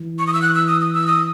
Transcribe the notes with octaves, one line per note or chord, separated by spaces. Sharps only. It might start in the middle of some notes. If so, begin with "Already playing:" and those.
Already playing: E3
C#6
D#6
E6
F#6
E6
D#6
D#6
E6
D#6